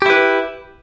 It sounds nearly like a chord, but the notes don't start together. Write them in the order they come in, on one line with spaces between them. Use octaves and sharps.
G4 E4 B4